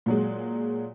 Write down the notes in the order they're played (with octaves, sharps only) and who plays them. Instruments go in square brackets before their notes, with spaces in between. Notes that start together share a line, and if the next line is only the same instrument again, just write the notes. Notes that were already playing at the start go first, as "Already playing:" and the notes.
[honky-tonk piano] A#2 F#3 G#3